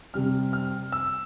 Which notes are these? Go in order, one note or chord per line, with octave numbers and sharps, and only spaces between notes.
C3 G3 C4 F6
F6
E6